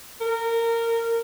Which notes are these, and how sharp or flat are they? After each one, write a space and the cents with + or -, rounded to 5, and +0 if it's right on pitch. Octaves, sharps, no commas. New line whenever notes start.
A#4 -20